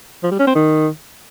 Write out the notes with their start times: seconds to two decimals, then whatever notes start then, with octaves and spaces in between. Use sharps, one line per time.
0.23 F3
0.31 G3
0.39 C#4
0.47 C4
0.55 D#3